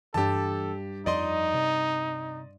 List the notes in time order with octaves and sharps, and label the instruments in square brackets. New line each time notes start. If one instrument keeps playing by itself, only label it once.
[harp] G2 [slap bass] E3 D4 [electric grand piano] G4 A5 [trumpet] A4
[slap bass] F2 F3 [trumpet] D#4 [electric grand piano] D5 D#5 C6
[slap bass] C3